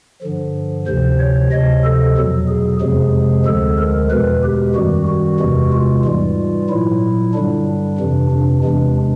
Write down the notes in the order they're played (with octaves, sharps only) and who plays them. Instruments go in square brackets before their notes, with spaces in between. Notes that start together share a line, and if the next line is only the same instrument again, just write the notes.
[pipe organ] G2 D3 F3
D2 C3 F3 C5
C#5
D2 C3 F3 D#5
A4
E2 B2 F#3
G#4
F2 C3 F3 G#3 G#4
D2 D3 F3 G#3 A4
A#4
E2 B2 G#3 B4
G4
F#2 D#3 G3 F#4
F#4
E2 C3 E3 G#3
F4
G#2 E3 G3 F4
A#2 F#3 E4
G2 D3 G3 D4
F2 C3 E3
D4
E2 C3 E3 G#3 D4